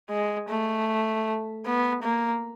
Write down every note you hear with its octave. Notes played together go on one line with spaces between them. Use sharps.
G#3
A3
B3
A#3